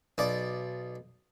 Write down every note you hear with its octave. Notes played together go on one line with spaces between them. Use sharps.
B1 D5